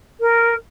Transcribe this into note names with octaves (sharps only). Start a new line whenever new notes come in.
A#4